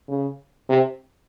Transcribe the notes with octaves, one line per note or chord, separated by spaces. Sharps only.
C#3
C3